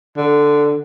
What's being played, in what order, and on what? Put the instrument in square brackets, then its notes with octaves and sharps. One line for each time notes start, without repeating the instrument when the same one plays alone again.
[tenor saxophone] D3